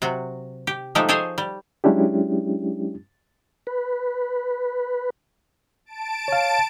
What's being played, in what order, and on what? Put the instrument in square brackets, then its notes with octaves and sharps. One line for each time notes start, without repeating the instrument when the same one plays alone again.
[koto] C3 F#3 F#4
G4
F3 G#3 A3 D#4 G4 A4
G#4 A4 C5 C#5 D#5 G#5
G3
[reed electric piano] F#3 G#3 C#4 D4 E4 G4
[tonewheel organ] B4
[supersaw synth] A5 D7
[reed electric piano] C#5 F5